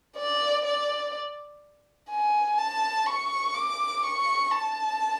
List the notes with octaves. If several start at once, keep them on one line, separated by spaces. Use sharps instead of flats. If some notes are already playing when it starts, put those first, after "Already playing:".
D5
D5
G#5
A5
C#6
D6
C#6
A5